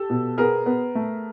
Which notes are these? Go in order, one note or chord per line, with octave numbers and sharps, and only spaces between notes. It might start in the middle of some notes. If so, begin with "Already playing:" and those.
Already playing: G4 A4
B2
B3 G#4 A#4
B3
A3